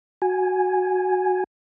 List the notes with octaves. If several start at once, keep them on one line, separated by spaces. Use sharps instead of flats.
F#4 G#5